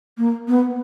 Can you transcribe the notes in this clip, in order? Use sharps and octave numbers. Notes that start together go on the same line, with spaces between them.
A#3
B3